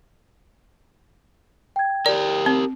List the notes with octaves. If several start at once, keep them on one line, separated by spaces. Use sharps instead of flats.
G5 G#6
G4 A#4 D5
C4